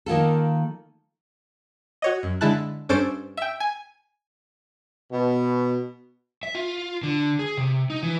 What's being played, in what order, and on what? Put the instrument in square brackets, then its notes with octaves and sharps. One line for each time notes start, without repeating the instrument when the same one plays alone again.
[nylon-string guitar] D#3 A#3 F4 A4
[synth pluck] F#4 C#5 D#5
F#2
D3 G#3 E4 A5 F#6
G2 C#4 D4 A4 C5 D7
E5 G5
G#5
[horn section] B2
[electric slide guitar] E5
F4
D3
G#4
C3
D#4
E3